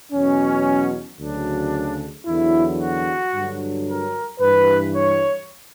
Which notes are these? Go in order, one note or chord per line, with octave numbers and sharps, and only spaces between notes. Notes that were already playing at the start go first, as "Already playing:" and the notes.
E2 B2 F#3 C#4
D2 C#3 F#3 D4
E2 D3 F#3 E4
F#4
G2 D3 F#3
A#4
G2 E3 B4
C#5